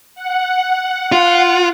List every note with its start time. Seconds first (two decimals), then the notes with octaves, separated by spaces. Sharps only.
0.15 F#5
1.12 F4